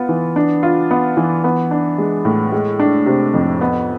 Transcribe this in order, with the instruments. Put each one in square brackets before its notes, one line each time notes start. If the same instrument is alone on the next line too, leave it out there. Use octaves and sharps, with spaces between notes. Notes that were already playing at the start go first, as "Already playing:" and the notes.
Already playing: [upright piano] B3 F4
E3
D4
F4
B3
E3
B3
D4
G#3
A2
G#3
D4
C3
F2
B3